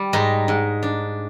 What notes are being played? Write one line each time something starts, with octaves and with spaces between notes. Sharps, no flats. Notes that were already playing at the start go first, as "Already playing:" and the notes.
Already playing: G3
G#2 D#4
G#2
D4